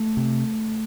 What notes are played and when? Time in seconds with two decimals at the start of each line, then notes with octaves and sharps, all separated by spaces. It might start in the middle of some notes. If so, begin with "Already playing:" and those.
Already playing: A3
0.17 C3